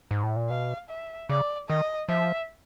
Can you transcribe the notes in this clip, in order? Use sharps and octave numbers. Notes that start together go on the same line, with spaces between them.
G#2
A2
A#2
B2 F5
E5
C#3 D5
D#3 D#5
F3 E5